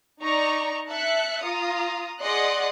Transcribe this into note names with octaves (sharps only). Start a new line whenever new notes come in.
D#4 D5 A#5 C#6
E5 A5 F#6 C#7
F4 A#5 D#6
G#4 D5 D#5 F#5 C6 F#6